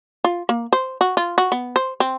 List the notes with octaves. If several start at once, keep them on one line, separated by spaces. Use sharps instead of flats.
F4
A#3
C5
F#4
F4
F#4
B3
C5
C4